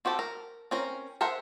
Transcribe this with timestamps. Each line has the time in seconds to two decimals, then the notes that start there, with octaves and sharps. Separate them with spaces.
0.05 C4 F#4 G4 A4
0.19 A#4
0.71 C4 C#4 A#4
1.21 A4 A#4 C5 E5 F#5